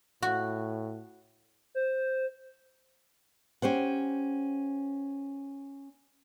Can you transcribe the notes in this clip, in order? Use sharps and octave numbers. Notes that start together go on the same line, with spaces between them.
A2 F#4
C5
C#4 G4 C5 F#5